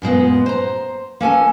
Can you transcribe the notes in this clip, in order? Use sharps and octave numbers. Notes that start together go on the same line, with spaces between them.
F#2 A#2 G#3 B3
C5 A#5
A#3 C#4 A4 G#5